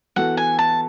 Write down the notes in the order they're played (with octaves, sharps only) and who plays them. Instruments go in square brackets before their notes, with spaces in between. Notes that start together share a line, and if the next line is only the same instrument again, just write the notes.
[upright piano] E3 B3 F#4 A4 [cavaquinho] F#5
[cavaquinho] G#5
A5